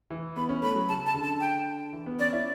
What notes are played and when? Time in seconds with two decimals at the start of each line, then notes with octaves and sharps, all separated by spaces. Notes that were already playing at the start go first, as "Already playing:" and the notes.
0.10 E3
0.36 B3 B5
0.49 C#4
0.62 A3 B5
0.75 F#3
0.89 C#3 A5
1.06 A5
1.14 D3
1.24 A5
1.40 G5
1.93 E3
2.06 B3
2.19 C#4 D5
2.33 E4